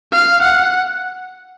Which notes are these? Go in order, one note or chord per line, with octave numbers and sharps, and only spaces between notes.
F5
F#5